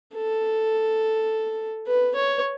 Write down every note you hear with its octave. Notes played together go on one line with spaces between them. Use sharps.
A4
B4
C#5